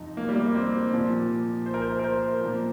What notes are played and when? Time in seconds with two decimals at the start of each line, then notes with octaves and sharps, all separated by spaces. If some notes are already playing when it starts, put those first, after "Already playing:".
Already playing: F2 C3 F3 D#4
0.17 A#3
0.29 G3
0.35 A#3
0.54 C4
0.92 A#2 F3
1.66 C5
1.74 A#4
1.82 C5
1.99 A#4
2.04 C5
2.41 A#2 F3